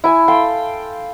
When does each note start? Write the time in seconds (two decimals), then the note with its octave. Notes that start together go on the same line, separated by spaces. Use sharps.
0.04 E4 G#5
0.28 A4 F5 G5 C6